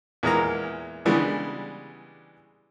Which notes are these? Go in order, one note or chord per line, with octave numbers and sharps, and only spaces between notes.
E2 A#2 G#3 A#4 A#5
C#3 E3 G3 G#3 B3 D4